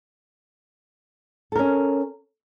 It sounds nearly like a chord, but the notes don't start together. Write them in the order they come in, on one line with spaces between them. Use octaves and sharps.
A4 A#4 C#4